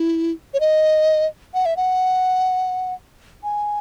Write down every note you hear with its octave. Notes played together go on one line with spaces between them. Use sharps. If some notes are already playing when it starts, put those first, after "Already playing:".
Already playing: E4
C#5
D#5
F#5
E5
F#5
G#5